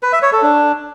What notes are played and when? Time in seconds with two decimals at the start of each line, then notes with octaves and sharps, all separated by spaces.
0.03 B4
0.13 E5
0.22 C#5
0.32 A4
0.42 D4